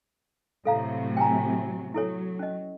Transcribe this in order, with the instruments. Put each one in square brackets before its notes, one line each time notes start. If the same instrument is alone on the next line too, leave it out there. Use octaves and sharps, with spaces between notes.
[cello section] A2 C3 F#3 [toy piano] A4 F5 A#5
[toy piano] G5 G#5 A#5
[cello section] F#3 [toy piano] E4 A4 C#5
[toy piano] C#4 D#5